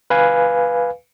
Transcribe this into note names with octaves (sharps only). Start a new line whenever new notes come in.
B4 F5 G#5